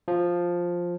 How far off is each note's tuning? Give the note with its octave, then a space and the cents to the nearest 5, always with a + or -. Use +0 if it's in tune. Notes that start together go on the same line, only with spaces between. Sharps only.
F3 +5